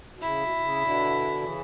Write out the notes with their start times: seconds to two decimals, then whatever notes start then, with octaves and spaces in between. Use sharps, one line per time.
0.14 B2
0.21 C#3 E4
0.41 B2
0.56 B2
0.62 C#3
0.82 B2 D3
1.42 C#3 E3